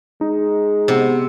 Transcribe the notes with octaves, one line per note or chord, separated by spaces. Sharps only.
G#3 D#4
C3 B3 F#5